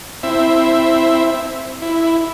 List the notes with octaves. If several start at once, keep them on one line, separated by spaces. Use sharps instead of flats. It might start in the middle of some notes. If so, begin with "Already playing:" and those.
C4 E4 E5
E4